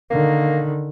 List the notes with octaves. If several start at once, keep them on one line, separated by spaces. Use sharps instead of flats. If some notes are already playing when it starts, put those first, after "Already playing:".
D3 D#3 A#3